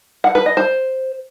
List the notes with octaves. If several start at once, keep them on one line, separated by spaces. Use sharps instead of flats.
F#5
B4
D#5
C5